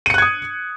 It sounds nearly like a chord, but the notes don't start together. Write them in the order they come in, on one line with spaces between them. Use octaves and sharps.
D#7 C#7 F#6 G#6 D#6